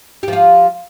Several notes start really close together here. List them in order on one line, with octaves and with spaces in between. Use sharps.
G4 F3 F4